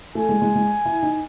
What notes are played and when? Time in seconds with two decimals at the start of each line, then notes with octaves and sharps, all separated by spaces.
0.15 A3 G#5
0.29 G#3
0.42 G#3
0.55 G#3
0.85 E4
1.03 D#4